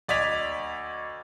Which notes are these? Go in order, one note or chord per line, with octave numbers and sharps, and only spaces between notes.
D2 D5 D#5 G#6 B6 F7